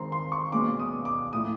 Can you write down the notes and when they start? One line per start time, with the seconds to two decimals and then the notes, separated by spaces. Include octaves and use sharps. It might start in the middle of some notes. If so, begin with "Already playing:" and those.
Already playing: D#3 G#3 C4 A#5 C6
0.12 C6
0.32 C#6
0.52 B2 G#3 C#4 D6
0.79 D#6
1.05 D6
1.32 A2 F3 A3 D#6